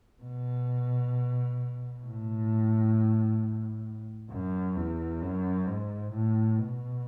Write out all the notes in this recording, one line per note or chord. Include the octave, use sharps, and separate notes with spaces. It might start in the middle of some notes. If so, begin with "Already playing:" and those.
B2
A2
F#2
E2
F#2
G#2
A2
B2